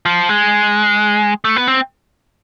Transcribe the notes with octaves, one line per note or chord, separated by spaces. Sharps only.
F3
G#3
A3
B3
C4